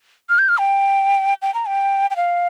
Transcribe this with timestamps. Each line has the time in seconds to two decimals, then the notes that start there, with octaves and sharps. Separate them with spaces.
0.29 F6
0.38 G6
0.49 F6
0.58 G5
1.42 G5
1.54 A#5
1.67 G5
2.10 G5
2.16 F5